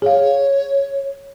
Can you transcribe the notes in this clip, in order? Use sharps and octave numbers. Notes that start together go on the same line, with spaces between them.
G#4 C#5 F5